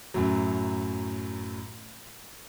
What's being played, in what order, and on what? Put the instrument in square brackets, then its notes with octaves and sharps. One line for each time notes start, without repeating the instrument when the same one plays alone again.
[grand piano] F#2 A2 F#3